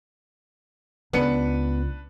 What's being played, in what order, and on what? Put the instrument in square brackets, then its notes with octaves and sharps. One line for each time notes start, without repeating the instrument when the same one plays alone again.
[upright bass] C#2 [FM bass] B3 [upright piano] D4 B4 C#7